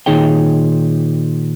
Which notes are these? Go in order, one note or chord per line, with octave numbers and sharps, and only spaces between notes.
A#2 D#3 D#4 G#4 C#5 G5